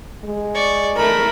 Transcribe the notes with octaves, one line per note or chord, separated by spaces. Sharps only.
G#3
D5 C#6
A3 A#4 B5